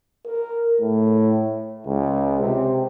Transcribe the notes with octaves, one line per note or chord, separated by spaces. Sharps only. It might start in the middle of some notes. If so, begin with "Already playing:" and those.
A#4
A2
C#2
C3